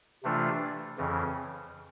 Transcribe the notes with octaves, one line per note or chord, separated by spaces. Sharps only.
C3 E3 A3 D4 F4
F2 C#3 E3